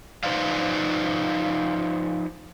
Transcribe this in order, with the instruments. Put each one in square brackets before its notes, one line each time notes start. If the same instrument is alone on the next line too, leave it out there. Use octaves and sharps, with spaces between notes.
[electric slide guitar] F3 D#4 B4 C5 D5 F5